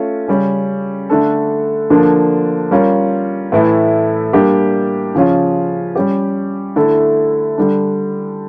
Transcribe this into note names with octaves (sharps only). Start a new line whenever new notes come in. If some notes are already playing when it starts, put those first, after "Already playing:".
Already playing: A3 C#4 F4
C#3 G3 C#4
D3 A3 D4 A4
D3 F3 A#3 D4
G3 C#4 F4 A#4
A2 E3 A3 E4
G3 A#3 D4 G4
C#3 F3 C#4 F4
G3 C#4 G4
D3 A3 E4 A4
D3 G3 D4